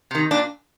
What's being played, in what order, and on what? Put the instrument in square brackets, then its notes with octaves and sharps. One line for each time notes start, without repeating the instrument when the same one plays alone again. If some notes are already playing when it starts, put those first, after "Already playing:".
[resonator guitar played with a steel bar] C3 D#3
A#2 D4